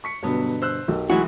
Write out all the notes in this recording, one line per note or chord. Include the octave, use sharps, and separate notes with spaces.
C#6 B6 C#7
G2 B2 D3 F#3 B3
C5 E6 F#6
B1 G4 A#4
E3 F#3 G#3 E4 F#4